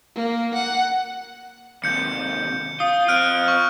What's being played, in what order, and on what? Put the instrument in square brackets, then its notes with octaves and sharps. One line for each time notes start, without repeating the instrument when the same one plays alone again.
[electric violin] A#3
F#5
[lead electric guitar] D#2 C3 [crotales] G6 C#7
[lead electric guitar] F4 [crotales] D#6
[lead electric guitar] C4 F4 [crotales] F6 F#6 D7
[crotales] C#6